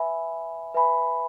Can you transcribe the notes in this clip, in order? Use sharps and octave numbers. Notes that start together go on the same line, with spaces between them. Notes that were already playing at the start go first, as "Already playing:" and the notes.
Already playing: B4 E5 G#5 B5
B4 E5 G#5 B5